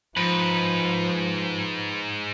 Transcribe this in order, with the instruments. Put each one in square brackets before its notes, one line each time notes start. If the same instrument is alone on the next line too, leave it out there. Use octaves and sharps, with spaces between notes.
[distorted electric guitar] G#2 [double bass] F3 [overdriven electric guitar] B4